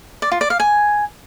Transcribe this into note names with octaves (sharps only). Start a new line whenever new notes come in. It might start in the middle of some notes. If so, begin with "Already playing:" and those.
D5
F4
D5
F5
G#5